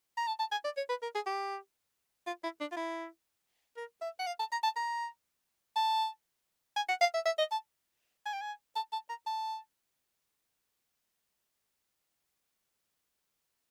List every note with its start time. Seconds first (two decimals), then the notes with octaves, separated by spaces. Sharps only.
0.17 A#5
0.27 A5
0.39 A5
0.52 G#5
0.65 D5
0.77 C#5
0.89 B4
1.03 A#4
1.15 G#4
1.26 G4
2.27 F4
2.44 E4
2.61 D4
2.72 F4
2.77 E4
3.77 A#4
4.01 E5
4.20 F#5
4.27 F5
4.39 A5
4.52 A#5
4.64 A5
4.76 A#5
5.76 A5
6.76 G#5
6.89 F#5
7.01 F5
7.14 E5
7.26 E5
7.39 D#5
7.52 A5
8.26 G#5
8.34 G5
8.41 G#5
8.76 A5
8.93 A5
9.09 A#5
9.27 A5